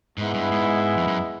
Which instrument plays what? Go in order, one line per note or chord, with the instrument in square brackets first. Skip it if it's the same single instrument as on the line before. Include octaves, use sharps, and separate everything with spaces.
[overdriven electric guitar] G#2 [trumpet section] G#3 B3 E4
[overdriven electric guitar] G2
G#2
F2
F#2